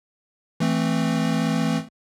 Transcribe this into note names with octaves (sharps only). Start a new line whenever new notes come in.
E3 A3 C4